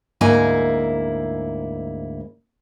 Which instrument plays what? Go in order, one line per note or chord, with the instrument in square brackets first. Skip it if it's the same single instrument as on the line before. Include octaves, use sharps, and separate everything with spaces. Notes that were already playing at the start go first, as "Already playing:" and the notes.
[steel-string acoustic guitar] D2 G#2 A#3 E4 G#5